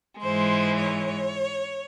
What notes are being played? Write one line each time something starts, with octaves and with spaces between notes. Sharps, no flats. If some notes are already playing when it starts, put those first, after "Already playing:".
G#2 E3 G#3 C5
C#5